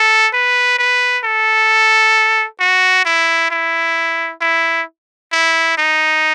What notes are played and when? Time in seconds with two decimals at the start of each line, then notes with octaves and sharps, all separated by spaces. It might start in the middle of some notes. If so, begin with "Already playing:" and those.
Already playing: A4
0.33 B4
0.78 B4
1.24 A4
2.60 F#4
3.05 E4
3.51 E4
4.41 E4
5.33 E4
5.78 D#4